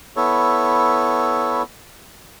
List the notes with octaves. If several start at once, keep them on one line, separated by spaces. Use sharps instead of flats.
B3 E4 A4 C#5